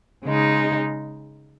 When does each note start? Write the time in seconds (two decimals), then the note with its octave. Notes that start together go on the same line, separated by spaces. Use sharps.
0.24 C#3 G#3 D#4